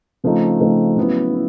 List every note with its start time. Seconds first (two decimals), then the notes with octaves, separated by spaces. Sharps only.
0.24 C#3 F3 A3 C4 D#4
0.60 C#3 F3 A3 C4 D#4
0.97 C#3 F#3 B3 E4
1.34 E4